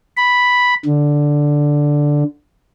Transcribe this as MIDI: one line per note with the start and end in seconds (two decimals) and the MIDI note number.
0.17 0.74 83
0.85 2.24 50